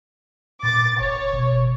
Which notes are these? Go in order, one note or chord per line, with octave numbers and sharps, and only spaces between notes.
A#2 D6 A6
F#1 C#5
B2